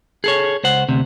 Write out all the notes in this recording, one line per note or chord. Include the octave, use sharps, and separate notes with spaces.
G#4 A4 C#5
C#2 C5 F#5
D2 C3